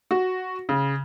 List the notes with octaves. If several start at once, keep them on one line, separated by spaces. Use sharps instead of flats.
F#4
C#3